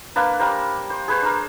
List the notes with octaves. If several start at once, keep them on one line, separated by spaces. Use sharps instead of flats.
A#3 D4 B4
G3 A#4 C5
C5
G#4 B4 C5
D4 A#4